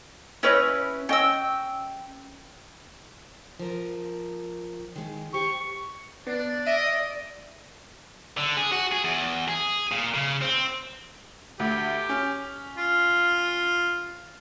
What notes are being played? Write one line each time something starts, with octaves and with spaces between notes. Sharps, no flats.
C#4 E4 B4 C#5 D#5
C#4 D#5 G5 E6
F3 A#4
D#3 G#3
G4 C5 C#6
B3 D4 D5
D#5 E5 D7
D3
G#4
F#4
G#4
E2
G#4
A#2
C#3
C4
D2 G4
C#4
F4